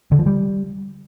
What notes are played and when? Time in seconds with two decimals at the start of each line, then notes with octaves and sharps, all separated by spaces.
0.12 D3
0.19 F3
0.26 G3